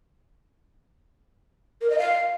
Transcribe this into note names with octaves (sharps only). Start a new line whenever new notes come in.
A#4
D#5
F5